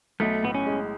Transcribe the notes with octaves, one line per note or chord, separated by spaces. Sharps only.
B1 A3
A2 B3
C#4
G#3